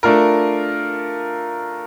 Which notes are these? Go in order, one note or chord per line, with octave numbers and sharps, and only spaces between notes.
A3 D4 F4 A#4